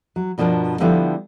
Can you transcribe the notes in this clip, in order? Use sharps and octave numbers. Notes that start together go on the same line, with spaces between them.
F#3
G2 B2 F3 D4 A#4 A5
D3 F3 G3 B3 E4 A4